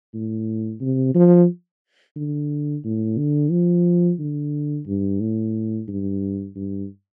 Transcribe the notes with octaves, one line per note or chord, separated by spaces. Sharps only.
A2
C3
F3
D3
A2
D3
F3
D3
G2
A2
G2
G2